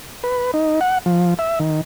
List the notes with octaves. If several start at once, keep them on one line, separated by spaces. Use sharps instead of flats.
B4
D#4
F#5
F3
E5
D#3